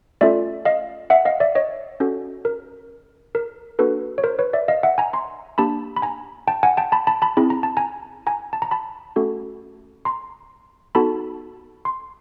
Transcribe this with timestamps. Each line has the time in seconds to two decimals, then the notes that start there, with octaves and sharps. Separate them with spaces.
0.21 A3 C#4 F4 A4 D5 E5
0.65 D#5 F5
1.10 E5 F#5
1.25 D#5 F5
1.40 D5 E5
1.55 C#5 D#5
2.00 C#4 F#4 A4
2.45 A#4
3.35 A#4
3.79 A#3 D4 F#4 A4 B4
4.18 C#5
4.24 A#4 C5
4.39 B4 C#5
4.53 D5 E5
4.68 D#5 F5
4.83 E5 F#5
4.98 G#5 A#5
5.13 A#5 C6
5.58 A#3 D4 G4 A5 B5
5.96 B5
6.02 G#5 A#5
6.48 G5 A5
6.63 F#5 G#5
6.77 G5 A5
6.92 A5 B5
7.07 A5 B5
7.22 A5 B5
7.37 C4 E4 G#4 B5
7.50 A#5
7.63 A5
7.77 G#5 A#5
8.27 G#5 A#5
8.53 A5
8.62 A#5
8.71 A5 B5
9.16 A3 C#4 F#4 A4
10.05 A#5 C6
10.95 B3 D#4 F#4 A4 A5 B5
11.85 C6